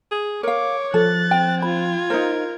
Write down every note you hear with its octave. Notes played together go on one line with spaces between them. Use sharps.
G#4
A#4 C#5 F5 D6
F3 A4 F#6 A6
C4 G5
F4 B5 G#6
D#4 A#4 C5